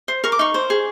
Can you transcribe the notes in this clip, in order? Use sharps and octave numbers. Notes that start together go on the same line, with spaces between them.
C5
A#4 C#6
D6
D#4 C#6
C5
G#4